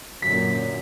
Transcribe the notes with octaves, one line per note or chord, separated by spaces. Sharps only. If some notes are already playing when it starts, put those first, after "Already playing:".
F#2 A#2 D3 B6